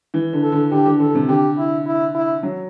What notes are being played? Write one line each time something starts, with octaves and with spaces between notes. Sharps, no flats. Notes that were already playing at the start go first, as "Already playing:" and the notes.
E3
D3
A4
D3
D3 G4
D3
D3 A4
C3
D3 G4
E4
E4
E4
F#3